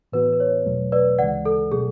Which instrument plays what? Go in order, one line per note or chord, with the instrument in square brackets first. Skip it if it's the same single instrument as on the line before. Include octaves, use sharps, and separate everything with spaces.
[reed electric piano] A2 E3 B3 F#4 [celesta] B4
[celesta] B4
C#5
[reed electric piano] E2 B2 F#3 A3
[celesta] B4 D5
[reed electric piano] D2 C#3 E3 G#3 [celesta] D5 F#5
[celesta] A4
[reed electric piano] B2 F#3 A3 [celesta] G#4